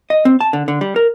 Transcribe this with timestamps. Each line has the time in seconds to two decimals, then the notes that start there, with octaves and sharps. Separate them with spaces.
0.10 D#5
0.25 C4
0.41 A5
0.53 D3
0.68 D3
0.81 G3
0.96 A#4